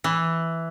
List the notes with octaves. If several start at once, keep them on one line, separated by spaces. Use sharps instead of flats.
E3